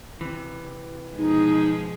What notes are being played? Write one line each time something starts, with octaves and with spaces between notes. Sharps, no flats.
C3 E3
B2 F3 G#3 D#4